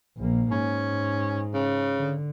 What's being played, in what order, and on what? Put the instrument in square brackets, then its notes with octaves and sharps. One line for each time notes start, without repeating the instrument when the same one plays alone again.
[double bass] A#1 A#3
[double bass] G#2 [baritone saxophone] C#4
[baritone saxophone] C#3
[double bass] D3